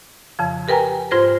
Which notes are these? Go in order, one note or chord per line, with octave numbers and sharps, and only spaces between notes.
F2 C#3 F3
G4 A#4 B4 G5 G#5 A#5
G#2 F4 C5 G#6 A#6